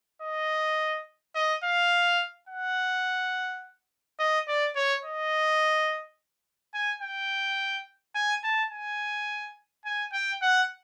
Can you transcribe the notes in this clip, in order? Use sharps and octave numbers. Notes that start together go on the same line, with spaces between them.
D#5
D#5
F5
F#5
D#5
D5
C#5
D#5
G#5
G5
G#5
A5
G#5
G#5
G5
F#5